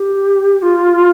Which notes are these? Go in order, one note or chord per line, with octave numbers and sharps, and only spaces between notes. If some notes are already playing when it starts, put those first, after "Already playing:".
Already playing: G4
G4
F4